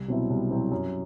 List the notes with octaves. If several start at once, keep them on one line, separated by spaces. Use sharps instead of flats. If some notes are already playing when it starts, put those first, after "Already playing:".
Already playing: C2
B2 F#3 C4 E4
C2
B2 F#3 C4 E4
F#2